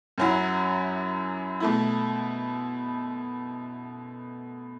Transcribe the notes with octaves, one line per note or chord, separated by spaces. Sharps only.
F#2 F#3 C#4 E4
B2 A3 E4